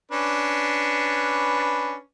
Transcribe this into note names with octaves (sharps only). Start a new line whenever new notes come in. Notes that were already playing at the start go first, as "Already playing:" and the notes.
C#4 D4 B4